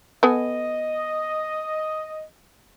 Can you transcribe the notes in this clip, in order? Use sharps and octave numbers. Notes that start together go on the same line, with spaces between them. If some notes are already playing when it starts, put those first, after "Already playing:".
B3 A4 D#5 G#5